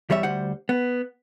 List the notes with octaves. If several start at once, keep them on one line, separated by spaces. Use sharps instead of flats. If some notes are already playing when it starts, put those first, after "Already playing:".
E2 G3 C#5 E5
D2 G3 C5 F#5
B3